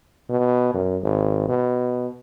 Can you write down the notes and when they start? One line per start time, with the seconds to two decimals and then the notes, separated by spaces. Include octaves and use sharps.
0.29 B2
0.74 F#2
1.03 G#1
1.49 B2